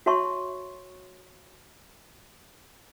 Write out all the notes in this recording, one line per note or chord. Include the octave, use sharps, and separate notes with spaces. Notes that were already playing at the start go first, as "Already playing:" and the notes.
F#4 C#5 E5 A5 C6 C#6